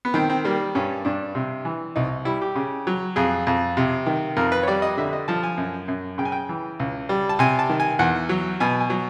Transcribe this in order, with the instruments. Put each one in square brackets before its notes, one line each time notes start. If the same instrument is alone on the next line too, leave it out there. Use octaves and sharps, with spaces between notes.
[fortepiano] B3
D#3 C4
C4
G3 A#3
G2 C#4
G2 D4
C3
E3
C2 D#4
G3 E4
G4
C#3
F#3
F2 G#4
F2
C3
D#3
F2 A#4
B4
C#5
G3 D5
D#5
D3 E5
D#5
F3 A5
G#5
F#2
F#2
C#3 G5
G#5
G5
E3
C#2
G3
A5
C3 G#5
A5
D#3
G#5
E2 F#5
F#3
B2 G#5
G#5
F#3